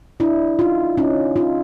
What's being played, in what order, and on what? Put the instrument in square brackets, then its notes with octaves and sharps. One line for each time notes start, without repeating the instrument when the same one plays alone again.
[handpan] D4 E4
D#4 F4
C#4 D#4
D#4 F4